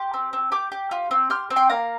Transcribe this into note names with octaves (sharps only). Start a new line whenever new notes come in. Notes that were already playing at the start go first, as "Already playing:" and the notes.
Already playing: G4 C6 F6
C4
C4
G4 D6 G6
G4
F4
C4
G4 C6 F6
C4
G5 C6
A#3 F5 A#5